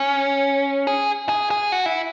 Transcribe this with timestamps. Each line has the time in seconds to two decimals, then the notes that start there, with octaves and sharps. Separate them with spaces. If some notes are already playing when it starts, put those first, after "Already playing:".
Already playing: C#4
0.87 G#4
1.29 G#4
1.51 G#4
1.72 F#4
1.86 E4